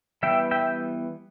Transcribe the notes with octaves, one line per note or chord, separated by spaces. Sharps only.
E3 G3 B3 E5 G5
E5 G5